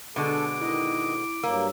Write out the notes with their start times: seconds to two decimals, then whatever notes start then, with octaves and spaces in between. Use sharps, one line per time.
0.16 B2 D3 G#3 A4 D6
0.61 D#3 E4 D#5
1.43 G2 F#3 A#3 E6